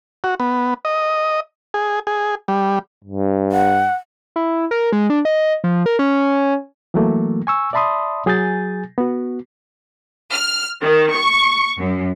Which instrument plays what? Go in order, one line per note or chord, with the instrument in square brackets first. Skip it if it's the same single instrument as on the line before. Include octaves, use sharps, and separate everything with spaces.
[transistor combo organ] F#4
B3
D#5
G#4
G#4
G3
[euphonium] G2
[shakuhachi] F#5
[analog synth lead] E4
A#4
G#3
D4
D#5
F3
A#4
C#4
[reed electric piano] E3 F#3 A3 A#3
G#5 C#6 E6
D5 E5 A5 B5 C6 D#6
F#3 G#4 G#5 G6 A6
B3 F#4
[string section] F6
D#3
C#6
F#2